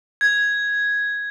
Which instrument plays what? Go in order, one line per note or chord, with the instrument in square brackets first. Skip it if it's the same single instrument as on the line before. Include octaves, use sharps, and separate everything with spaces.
[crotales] G#6